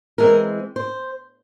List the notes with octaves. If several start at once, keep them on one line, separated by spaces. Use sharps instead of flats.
E3 G#3 C4 A#4
C5